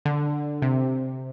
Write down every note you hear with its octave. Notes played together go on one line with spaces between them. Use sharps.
D3
C3